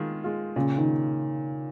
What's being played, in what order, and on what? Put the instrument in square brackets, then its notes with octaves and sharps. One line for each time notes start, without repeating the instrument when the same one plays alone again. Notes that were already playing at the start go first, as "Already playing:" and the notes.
Already playing: [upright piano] D#3 G#3 F4
G#3 F4
[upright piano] A#2 [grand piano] C#3
[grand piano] D#3